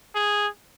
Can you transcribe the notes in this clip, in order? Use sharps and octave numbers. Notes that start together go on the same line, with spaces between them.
G#4